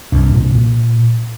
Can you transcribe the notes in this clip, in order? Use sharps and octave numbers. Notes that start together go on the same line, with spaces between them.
C2 D4
A#2
A#2